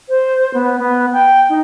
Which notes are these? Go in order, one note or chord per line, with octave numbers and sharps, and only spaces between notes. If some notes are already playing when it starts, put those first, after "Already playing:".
C5
B3
B3
G5
D#4